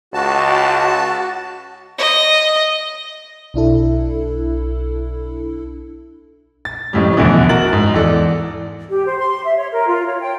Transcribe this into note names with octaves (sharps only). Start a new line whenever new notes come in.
C#2 F#4 A5
D#5
B1 D4 E4 A4
A6
F2 A2 C#3 G3
A#1 E2 B2 D3 E3
F#4 A#4 A6 F#7
G#2
E2 A4 D5
G4
C5
C6
E5
C#5
A#4
F4
C#5
G5